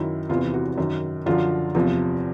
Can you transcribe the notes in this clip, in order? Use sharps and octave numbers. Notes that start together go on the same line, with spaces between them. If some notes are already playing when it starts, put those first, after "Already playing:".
Already playing: F#2 D#3 E4
E2 C3 E3 F4
F#4
F#2 D#3
F#2 D3 F3 F4
E2 C3 F3